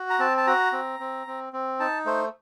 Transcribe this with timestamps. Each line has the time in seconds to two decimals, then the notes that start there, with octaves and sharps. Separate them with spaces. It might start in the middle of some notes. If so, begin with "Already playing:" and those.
Already playing: F#4
0.10 A#5
0.19 C4 A5
0.37 A5
0.47 F#4 A#5
0.73 C4
1.00 C4
1.27 C4
1.53 C4
1.80 D#4 A5
2.06 A3 C5